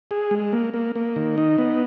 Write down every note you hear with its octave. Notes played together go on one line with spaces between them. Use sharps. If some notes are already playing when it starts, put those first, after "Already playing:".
G#4
G#3
A#3
A#3
A#3
D#3
D#4
B3